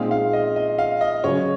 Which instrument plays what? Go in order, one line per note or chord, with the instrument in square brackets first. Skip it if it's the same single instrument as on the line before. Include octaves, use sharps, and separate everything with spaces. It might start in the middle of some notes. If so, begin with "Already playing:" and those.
Already playing: [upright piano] A#2 G#3 C4 D#4 G#4 [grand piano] F5
[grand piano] F5
D#5
D#5
F5
D#5
[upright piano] C#3 F#3 C#4 [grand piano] C#5